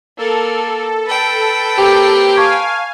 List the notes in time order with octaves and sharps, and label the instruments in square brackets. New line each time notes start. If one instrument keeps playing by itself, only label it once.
[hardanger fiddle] A#3 [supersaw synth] A4
[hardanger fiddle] B4 G5
[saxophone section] A#3 C4 G4
[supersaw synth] F5 G#5 [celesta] A5 C#6 G#6